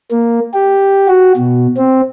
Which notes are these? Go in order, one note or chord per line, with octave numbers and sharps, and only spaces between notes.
A#3
G4
F#4
B2
C4